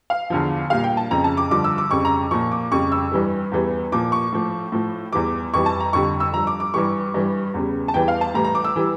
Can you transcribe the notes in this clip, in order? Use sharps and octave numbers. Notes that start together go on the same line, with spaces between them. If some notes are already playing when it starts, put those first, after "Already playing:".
F5
E2 D3 F3
A#2 G3 F5
G5
A5
F2 C#3 F3 A#5
A5
D6
G2 D3 F3 D6
E6
D6
F2 C#3 G3 C#6
A#5
A#2 F3 C#6
D6
F2 C#3 G3 C#6
E6
G2 E3 G3
E2 E3 G3
A#2 F3 D6
C#6
A2 F3
A2 F3
E2 E3 G3 D6
F2 E3 G3 C#6
A5
A#5
F2 D3 G3 C#6
E6
G2 F3 A#5
D6
D6
G2 E3 G3 C#6
G2 E3 G3
E2 C#3 G3
A5
E2 E3 G3 G5
F5
A5
A2 E3 G3 A#5
A#5
D6
E6
E3 G3